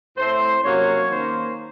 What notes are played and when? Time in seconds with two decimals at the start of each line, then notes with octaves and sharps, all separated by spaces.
0.17 A2 A3 C4 C5
0.63 C3 F#3 A#3 C#4 C#5
1.09 D#3 A#3 C#4 C5